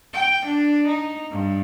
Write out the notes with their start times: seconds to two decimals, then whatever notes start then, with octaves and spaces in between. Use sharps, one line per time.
0.14 G5
0.45 D4
0.87 D#4
1.31 G2